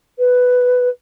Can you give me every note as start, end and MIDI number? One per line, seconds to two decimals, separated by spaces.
0.19 0.89 71